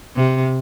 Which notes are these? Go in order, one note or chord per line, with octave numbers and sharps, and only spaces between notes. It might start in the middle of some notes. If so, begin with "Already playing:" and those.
C3